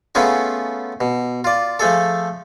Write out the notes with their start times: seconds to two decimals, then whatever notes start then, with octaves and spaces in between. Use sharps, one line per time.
0.15 A3 B3 C#4 F4 G#4
1.01 B2
1.44 F4 D5
1.79 F3 A3 G#4 A4